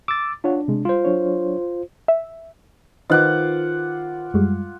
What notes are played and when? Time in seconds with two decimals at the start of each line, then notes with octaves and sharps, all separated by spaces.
0.08 D6 E6 A6
0.44 D4 F4 C#5 F#5
0.68 C3 G#3
0.85 G3 F4 C5
1.05 F#3 D4 C#5
2.08 E5
3.10 D#3 F4 B4 C5 D#5 F#5 D6 F#6
4.34 F#2 G3 G#3